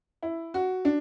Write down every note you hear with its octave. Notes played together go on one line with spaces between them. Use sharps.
E4
F#4
D4